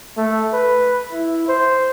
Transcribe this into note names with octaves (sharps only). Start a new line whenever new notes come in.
A3
B4
E4
C5